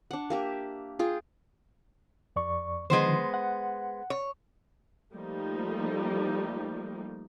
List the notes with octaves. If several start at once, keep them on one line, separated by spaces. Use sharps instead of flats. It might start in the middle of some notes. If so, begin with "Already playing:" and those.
D4 F#5
A#3 G4 E5
F4 G#4 G5
F2 D5 C#6
D3 D#3 F3 G#3 B3 C5
F#5
C#5
F3 G3 A3 A#3 D#4